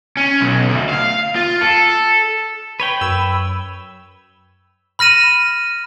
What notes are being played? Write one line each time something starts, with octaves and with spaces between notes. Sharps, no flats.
C#4
B1
D2
F5
F4
A4
B4 C#5 G5 B5
F#2 E6
B5 F6 A#6 D#7 E7